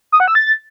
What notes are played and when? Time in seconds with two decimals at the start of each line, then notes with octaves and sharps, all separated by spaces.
0.12 D#6
0.20 F#5
0.28 E6
0.35 A6